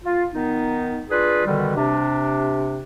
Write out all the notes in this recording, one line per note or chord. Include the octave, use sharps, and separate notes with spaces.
F4
D#3 B3 D#4
D4 F4 G#4 B4
B2 D3 D#3 G3
C3 D4